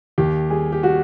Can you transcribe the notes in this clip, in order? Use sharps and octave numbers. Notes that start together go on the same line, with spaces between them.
D#2 G4
G3 G#4
G4
G3 F#4